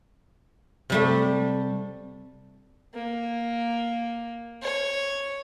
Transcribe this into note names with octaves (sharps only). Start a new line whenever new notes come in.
C3 G3 A3
A#3
C#5